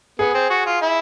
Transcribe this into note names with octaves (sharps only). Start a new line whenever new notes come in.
B3 G#4
C4
F#4
F4
E4